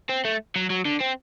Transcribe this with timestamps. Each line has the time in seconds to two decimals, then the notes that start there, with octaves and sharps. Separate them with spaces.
0.09 C4
0.25 A3
0.56 F#3
0.70 F#3
0.85 D3
1.00 C4